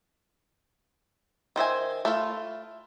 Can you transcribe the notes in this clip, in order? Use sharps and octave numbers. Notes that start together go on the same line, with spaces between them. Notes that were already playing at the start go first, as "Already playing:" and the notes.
D#3 C5 E5 G#5
A3 E4 F4